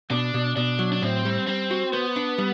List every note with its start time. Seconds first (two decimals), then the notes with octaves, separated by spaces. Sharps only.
0.10 B2 D4
0.34 B2
0.56 B2 D4
0.79 F#3
0.92 D4
1.02 A2 C4
1.25 G3
1.47 G3 C4
1.71 F#4
1.93 B3 C5
2.16 D4
2.38 G3